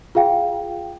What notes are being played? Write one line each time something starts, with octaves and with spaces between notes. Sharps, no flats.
F4 G#4 F5 G5